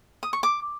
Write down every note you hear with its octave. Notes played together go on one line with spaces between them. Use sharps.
D#6
C#6
D6